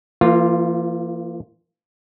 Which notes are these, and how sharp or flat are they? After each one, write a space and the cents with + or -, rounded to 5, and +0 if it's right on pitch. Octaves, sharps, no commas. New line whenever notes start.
E3 +40 A#3 -25 F4 +0